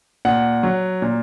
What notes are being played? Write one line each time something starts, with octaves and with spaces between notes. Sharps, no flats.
A#2 F#5
F#3
A#2